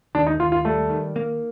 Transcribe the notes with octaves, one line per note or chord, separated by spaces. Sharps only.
D#2 D4
D#4
D#2 F4
F4
G3 A3
D#3
A#3